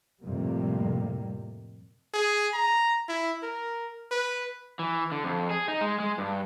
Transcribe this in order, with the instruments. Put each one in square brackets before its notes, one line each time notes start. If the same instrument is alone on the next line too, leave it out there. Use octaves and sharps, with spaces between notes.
[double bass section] F2 A2 C3 G3 A#3
[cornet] G#4
A#5
E4
A#4
B4
[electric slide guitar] E3
D3
F2
G#4
D#4
G#3
G#3
G2